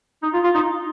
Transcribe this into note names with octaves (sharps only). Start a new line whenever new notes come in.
D#4
F4
F4
D#4